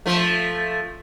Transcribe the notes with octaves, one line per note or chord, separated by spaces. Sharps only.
F3 A3